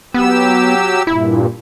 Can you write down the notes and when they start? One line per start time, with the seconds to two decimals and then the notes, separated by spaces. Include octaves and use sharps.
0.14 F#3 B3 G4 E6
1.07 G2 A#2 E4